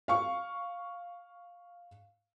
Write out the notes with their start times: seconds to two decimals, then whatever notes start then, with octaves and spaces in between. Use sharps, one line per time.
0.08 F5 C#6